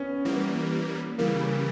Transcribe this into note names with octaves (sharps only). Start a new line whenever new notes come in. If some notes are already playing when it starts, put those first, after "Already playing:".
Already playing: B3 C#4
E3 G3 A#3 B3
C#3 E3 G3 A#3